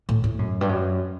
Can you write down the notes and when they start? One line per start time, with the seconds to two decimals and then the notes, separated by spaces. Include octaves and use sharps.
0.09 A2
0.24 A2
0.39 F#2
0.61 G2
0.69 F#2